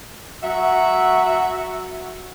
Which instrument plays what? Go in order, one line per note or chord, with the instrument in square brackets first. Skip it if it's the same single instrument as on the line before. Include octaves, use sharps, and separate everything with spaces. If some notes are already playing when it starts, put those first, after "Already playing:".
[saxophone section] F#3 F#4 E5